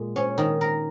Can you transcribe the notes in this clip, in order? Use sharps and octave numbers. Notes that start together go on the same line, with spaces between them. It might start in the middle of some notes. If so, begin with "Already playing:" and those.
Already playing: A#2 G#3
C#4
D#3
A#4